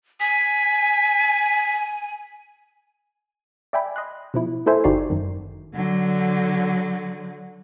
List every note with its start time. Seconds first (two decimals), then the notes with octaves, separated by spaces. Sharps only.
0.20 G#5 B6
3.73 D5 E5 G5 G#5 B5
3.96 D#5 C6 F#6
4.34 B2 F3 E4
4.66 A#3 E4 A4 C5 E5 G#5
4.84 G1 D#4 F#4 G4 D5 C7
5.10 F#2 D#3
5.75 D3 F#3